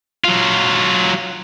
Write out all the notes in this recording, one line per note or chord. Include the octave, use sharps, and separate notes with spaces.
F#3 F4